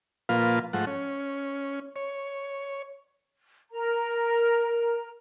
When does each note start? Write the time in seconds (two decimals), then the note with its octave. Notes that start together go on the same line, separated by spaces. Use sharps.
0.29 A#2 F3 A#3 F4 B4 F5
0.73 G#2 F3 A3 F#5
0.87 C#4
1.96 C#5
3.71 A#4 A#5